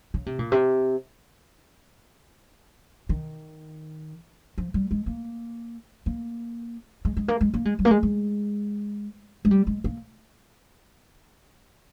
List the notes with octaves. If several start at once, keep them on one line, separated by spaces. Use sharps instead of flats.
C#3
C3
A#2
C3
D#3
F3
G3
G#3
A#3
A#3
G#3
G#3
A#3
G#3
A#3
G#3
G3
A#3
G#3
G#3
G#3
G3
G#3
A#3